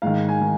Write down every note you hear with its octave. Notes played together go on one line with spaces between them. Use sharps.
G#2 D#3 F5
G#5
D#3